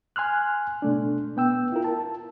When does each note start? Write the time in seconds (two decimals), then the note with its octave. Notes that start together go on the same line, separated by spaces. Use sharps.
0.16 G#5 C6 F6 F#6
0.82 B2 A3 D4
1.37 B3 G5 E6
1.72 E4 F4 A#4
1.84 A5